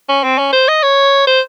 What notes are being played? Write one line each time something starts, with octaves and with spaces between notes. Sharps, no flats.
C#4
C4
C#4
C5
D#5
C#5
C5